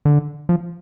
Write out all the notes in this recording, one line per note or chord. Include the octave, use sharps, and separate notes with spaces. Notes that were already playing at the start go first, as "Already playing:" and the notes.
D3
F3